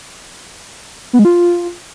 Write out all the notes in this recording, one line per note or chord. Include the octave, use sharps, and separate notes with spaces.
B3
G#3
F4